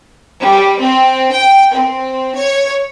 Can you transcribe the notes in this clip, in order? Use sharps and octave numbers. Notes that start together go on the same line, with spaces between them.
G3
C4
G5
C4
C#5